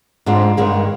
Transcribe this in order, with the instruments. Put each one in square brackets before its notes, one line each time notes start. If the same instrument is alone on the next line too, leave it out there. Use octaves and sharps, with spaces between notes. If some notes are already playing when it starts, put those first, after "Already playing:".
[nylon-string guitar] G#2 G#3 C4 D4 F4
G2 D#3 G#3 A#3